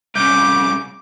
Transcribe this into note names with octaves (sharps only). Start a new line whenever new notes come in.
C2 C#3 D6 G6